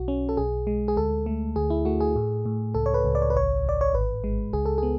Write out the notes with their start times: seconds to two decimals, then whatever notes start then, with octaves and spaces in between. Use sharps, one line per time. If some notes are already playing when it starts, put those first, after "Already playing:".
Already playing: B1 F#4
0.08 C#4
0.29 A4
0.37 B1 G#4
0.67 G#3
0.88 G#4
0.97 D2 A4
1.26 A3
1.56 D2 G#4
1.70 E4
1.85 A3 F#4
2.01 G#4
2.16 A2
2.46 A2
2.74 C#2 A4
2.86 C#5
2.94 B4
3.05 C#2
3.15 D5
3.22 C#5
3.30 B4
3.34 A1 C#5
3.65 A1 D5
3.81 C#5
3.93 G#1 B4
4.24 G#3
4.53 C#2 G#4
4.66 A4
4.78 B3 G#4